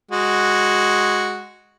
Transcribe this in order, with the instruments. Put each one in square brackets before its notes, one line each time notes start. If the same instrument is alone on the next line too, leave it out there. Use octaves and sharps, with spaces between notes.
[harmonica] G#3 F#4